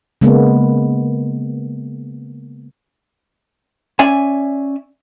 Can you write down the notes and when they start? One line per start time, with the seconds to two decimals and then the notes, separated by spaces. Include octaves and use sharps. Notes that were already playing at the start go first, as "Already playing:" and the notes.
0.21 C#3 G#3 A#3 B3
3.99 C#4 D5 E5 G#5